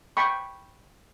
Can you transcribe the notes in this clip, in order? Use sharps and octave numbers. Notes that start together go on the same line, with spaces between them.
G5 B5 C#6